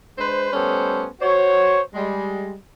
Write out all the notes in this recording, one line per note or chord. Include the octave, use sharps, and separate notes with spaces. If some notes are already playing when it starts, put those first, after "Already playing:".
G#3 D4 B4 C5
G3 A3 B3 C#4 A4 C5
F#4 C5 C#5
G3 G#3